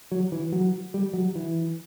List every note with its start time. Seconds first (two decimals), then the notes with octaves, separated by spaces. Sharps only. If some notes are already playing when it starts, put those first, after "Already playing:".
0.12 F#3
0.32 E3
0.52 F#3
0.94 G3
1.14 F#3
1.35 E3